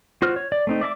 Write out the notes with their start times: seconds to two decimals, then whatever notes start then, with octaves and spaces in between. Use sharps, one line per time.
0.22 F4 F#4 C5 F6
0.36 C#5
0.52 D5
0.67 A3 C4 D#4
0.81 D5 E5 A5 D6